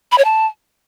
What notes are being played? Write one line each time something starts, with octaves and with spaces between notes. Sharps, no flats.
B5
C#5
A5